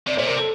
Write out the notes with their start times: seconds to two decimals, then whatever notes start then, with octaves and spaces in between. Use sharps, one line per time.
0.07 C3 D5
0.17 A#2 C5
0.27 C3 A#4
0.38 A4